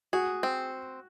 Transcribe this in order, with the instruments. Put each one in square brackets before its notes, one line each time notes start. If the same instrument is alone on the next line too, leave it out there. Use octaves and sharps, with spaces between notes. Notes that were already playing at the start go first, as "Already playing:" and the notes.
[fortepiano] F#4 [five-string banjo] G#4
[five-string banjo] C4